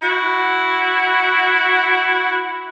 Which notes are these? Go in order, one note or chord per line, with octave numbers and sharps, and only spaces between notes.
E4 F#4